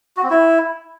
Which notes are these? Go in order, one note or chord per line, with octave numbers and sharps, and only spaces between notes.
F#4
C4
E4